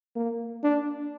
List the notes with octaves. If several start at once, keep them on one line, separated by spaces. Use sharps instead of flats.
A#3
D4